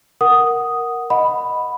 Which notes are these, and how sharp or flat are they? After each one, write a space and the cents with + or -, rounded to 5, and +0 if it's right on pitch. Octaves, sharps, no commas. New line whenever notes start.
A#4 +5 F#5 +0 D#6 +0
D#5 +5 F#5 -15 B5 +0